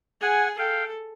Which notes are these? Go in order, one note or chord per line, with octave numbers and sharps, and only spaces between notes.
G#4 F#5 G#5
A4 F5 G5